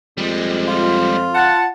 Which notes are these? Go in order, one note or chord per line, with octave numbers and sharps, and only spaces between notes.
F2 G3 G#3
F4
F#5 A5